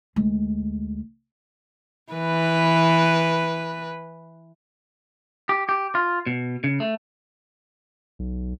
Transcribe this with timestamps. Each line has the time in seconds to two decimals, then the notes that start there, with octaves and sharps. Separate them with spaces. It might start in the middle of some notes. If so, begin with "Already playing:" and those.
0.16 D2 G#3
2.12 E3 B4
5.49 G4
5.69 G4
5.95 F4
6.27 B2
6.64 C#3
6.80 A3
8.19 B1